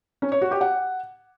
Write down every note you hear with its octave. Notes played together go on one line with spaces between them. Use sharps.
C#4
C#5
F#4
G4
F#5